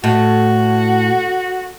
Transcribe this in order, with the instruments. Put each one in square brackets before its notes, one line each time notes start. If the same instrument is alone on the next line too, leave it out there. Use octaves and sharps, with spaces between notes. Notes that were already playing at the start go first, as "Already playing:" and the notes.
[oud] A2 [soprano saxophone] F#4